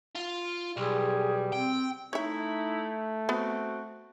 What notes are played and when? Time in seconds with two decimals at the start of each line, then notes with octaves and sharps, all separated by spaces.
0.16 F4
0.77 B1 G3 G#4
1.52 C4 G5
2.13 A3 D#4 E4 C#5 E5
3.29 B3 C4 F#4